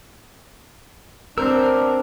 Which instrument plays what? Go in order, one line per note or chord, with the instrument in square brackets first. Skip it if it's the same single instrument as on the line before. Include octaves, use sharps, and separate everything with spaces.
[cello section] C4 [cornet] D4 [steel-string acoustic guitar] A#4 [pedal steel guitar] C5 E6